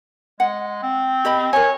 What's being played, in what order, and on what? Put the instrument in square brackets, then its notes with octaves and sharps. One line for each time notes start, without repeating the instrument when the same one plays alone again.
[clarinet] G#3 [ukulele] F#5
[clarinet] C4
[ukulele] G4 D#5 B5
[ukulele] A#4 G#5 [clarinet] C#5